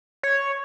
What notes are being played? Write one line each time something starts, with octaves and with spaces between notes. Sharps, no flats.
C#5